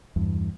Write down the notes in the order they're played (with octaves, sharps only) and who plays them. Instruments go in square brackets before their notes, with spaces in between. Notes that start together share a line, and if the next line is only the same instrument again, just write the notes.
[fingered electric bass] E2 G2